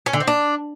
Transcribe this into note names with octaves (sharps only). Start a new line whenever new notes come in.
C#4
D3
C4
D4